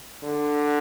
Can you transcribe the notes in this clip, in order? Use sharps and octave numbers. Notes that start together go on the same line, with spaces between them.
D3